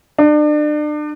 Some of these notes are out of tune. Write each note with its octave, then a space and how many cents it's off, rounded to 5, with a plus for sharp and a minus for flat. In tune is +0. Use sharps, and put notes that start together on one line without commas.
D4 +35